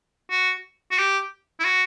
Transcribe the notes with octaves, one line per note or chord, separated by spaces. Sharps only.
F#4
F#4
G4
E4
F#4